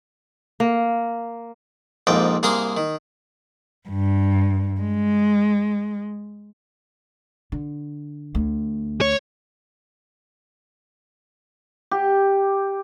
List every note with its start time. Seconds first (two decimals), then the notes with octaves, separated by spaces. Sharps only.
0.60 A#3
2.07 A#1 F2 G#2 A#3 G5
2.43 C2 A#3 G#4 F5 A#5 C6
2.77 D#3
3.89 G2
4.81 G#3
7.52 D3
8.35 D2
9.01 C#5
11.91 G4